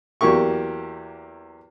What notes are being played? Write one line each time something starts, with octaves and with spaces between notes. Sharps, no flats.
E2 F#3 A#3 G4 C#6